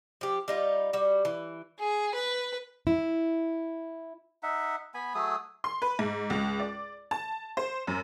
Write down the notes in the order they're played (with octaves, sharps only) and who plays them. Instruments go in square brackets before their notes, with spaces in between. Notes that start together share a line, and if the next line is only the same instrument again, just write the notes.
[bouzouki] F3 G4
G3 D#4 F4
G3 F#4
E3
[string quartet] G#4
B4
[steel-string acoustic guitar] E4
[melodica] D#4 E5 F#5
B3 G#5 B5
F#3 A3 G#4 D#6
[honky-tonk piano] C6
B4
G#2
C#2
D5
A5
C5
F#2